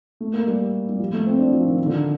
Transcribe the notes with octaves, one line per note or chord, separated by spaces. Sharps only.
A3
A#3
G3
G3
F3
A3
C4
D4
F3
D#3
D#3
D3